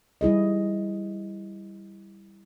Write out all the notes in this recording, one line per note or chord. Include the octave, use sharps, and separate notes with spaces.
G3 E4 G#4 D#5